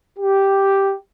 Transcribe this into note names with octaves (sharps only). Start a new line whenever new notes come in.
G4